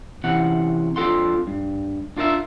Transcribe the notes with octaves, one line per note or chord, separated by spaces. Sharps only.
C3 E3 C#4 F#5
F2 D4 F4 A4 F#5 C6
G2
D4 F4 A#4 D5 E5